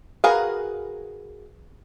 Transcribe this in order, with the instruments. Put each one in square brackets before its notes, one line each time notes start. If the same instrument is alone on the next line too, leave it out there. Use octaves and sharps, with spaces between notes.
[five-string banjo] F#4 G#4 A#4 B4 F5